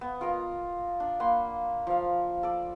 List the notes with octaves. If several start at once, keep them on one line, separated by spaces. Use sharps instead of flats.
B3
F4 A#4 D#5 A#5
D4
A#3 F#5 B5 C6
F3 F5
A4 D5